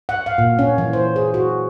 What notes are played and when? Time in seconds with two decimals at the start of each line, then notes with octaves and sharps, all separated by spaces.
0.09 F#5
0.26 F5
0.38 A#2
0.59 C#4
0.78 E3
0.93 C5
1.16 G#4
1.34 F#4